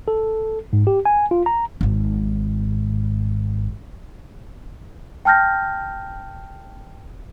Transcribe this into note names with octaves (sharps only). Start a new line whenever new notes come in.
A4
G#2
G4
G#5
F4
A#5
G#1 G#2
G5 A5 F6 G6 A#6